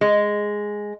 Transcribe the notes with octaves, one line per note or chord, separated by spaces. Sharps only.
G#3